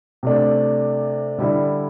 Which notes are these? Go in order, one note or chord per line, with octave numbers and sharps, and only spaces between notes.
C3 A3 D4
D3 G3 E4